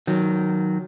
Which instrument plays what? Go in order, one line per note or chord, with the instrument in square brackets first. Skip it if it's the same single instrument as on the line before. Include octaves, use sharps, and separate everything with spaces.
[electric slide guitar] D#3 F#3